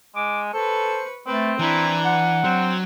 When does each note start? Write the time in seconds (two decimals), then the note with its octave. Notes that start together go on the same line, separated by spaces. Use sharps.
0.16 G#3 D6
0.54 A4 B4 C5 C#6
1.27 A3 C4 B4
1.59 E3 D4 E4 A#5
2.05 F#5
2.44 F#3 C4